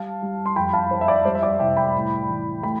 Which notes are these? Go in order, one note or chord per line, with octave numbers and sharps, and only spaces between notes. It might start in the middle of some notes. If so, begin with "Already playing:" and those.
Already playing: G3 F5 A5
G3
C6
F2 G5 B5
F5 A5
F2 C5
E5
D5
G3 C5
E5
D5
C2 E5 G5
G5 B5
A2
E3
A3 G5 B5